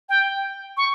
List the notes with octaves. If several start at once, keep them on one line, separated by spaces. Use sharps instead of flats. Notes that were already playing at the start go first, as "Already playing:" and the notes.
G5
C#6